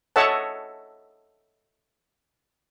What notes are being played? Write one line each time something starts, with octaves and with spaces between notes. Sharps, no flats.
A4 C#5 D#5 E5 F#5 A5